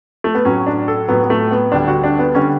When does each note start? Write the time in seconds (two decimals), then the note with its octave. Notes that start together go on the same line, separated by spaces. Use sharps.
0.24 A3
0.35 B3
0.45 A2 F#3 C#4
0.67 D4
0.88 A4
1.09 A2 F#3 B3
1.24 B3
1.30 A3
1.51 B3
1.72 D2 D3 G3 D4
1.88 F#4
2.04 D4
2.19 B3
2.35 D3 G3 C#4